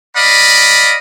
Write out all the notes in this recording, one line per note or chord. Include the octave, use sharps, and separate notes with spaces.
D5 D#5 F5 B5